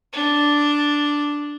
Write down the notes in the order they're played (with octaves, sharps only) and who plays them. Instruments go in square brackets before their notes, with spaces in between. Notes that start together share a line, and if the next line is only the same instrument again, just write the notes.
[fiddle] D4